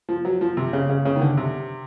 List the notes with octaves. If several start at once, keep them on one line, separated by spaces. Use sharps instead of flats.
F3
F#3
F3
C3
C#3
C#3
C#3
D#3
D3
C3